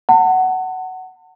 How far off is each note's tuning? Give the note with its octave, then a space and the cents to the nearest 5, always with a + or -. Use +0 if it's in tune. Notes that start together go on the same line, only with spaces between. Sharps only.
F#5 +10 A5 +40